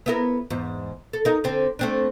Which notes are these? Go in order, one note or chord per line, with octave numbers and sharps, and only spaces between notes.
B3 E4 A#4
E2 G#2
A4
D#4 A#4
D3 C4
A3 C4 D4